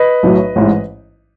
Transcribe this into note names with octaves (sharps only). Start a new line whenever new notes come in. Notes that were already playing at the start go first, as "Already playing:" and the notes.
Already playing: B4 D#5
B1 A2 F#3
A1 G#2 E3